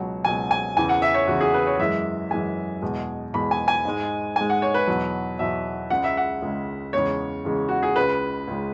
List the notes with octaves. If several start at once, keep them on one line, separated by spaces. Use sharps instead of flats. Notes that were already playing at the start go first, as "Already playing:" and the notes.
Already playing: C#2 B2 F#3
C#2 B2 F#3 G#5
G#5
E2 C#3 E3 G#5
F#5
E5
C#5
E2 C#3 E3 F#4
G#4
B4
C#5
F#2 E3 G#3 E5
F#2 E3 G#3 G#5
E2 B2 G#3
E2 B2 G#3 B5
G#5
G#5
G#2 G#3
G#2 G#3 G#5
F#5
C#5
B4
E2 B2 F#3
E2 B2 F#3 E5
C#2 C#3 G#3 F#5
E5
F#5
C#2 C#3 G#3
E2 C#3 G#3 C#5
E2 C#3 G#3
F#4
G#4
C#2 C#3 G#3 B4
C#2 C#3 G#3